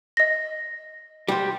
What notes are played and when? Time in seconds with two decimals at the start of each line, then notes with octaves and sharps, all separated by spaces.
0.17 D#5 A#6
1.28 G3 F#4 C5